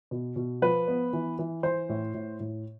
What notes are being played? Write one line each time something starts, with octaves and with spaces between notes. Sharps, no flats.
B2
B2
F3 B4
B3
E3
E3
E3 C5
A2
A2
A2